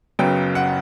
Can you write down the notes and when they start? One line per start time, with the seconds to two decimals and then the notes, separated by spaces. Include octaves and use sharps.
0.19 F#1 F#2 C#3 F#3 B3 G5
0.55 F#5